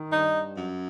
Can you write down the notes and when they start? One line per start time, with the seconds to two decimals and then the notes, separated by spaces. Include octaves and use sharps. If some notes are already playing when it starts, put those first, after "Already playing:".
Already playing: D#3
0.09 G2 D#4
0.55 F#2